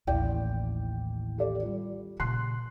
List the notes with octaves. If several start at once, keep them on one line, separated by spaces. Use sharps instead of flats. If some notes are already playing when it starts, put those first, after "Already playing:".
A1 D#2 E4 D5 G5
G4 A4 D5
G3 F4
A#2 C#3 C6 F#6 C7